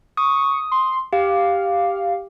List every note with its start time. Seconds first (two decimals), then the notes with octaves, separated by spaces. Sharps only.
0.17 C#6 D#6
0.72 C6
1.13 G4 F5